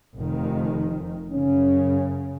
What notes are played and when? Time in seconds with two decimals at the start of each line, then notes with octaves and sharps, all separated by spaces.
0.15 F1 F2 D#3
1.32 F#2 C#3 C#4